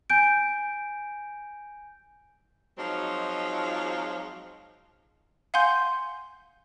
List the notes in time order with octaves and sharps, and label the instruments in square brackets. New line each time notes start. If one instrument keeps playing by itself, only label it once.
[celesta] G#5 G6 D7
[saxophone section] F3 F#3 G#3 C4 D#4 F4
[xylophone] F5 F#5 G#5 C6 G6